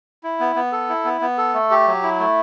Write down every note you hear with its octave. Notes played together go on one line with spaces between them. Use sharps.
E4
B3
B3
A4
E4
B3
B3
A4
A3
G4
F#3
E4
A3